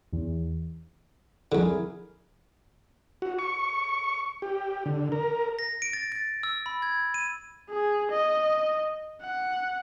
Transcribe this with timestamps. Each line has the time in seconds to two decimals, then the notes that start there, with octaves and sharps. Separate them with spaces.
0.13 E2
1.52 F2 D3 E4 G#4 A#4
3.22 F#4
3.39 C#6
4.42 G4
4.86 D3
5.12 A#4
5.59 A#6
5.82 D7
5.93 A6
6.12 A6
6.43 E6
6.66 B5
6.82 G#6
7.14 D#7
7.69 G#4
8.11 D#5
9.22 F#5